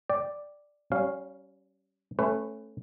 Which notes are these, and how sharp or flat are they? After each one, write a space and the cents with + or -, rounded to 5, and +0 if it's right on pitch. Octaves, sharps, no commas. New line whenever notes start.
D5 +0 G5 +0
G3 -35 C#4 +0 F5 +0
A3 +0 C#4 -15 B4 +25